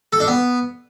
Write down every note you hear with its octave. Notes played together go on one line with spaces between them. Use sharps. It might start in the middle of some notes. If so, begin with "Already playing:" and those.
A4
D4
B3